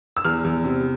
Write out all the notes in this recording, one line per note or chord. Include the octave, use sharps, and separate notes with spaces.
E6
E2 F6
E2
C3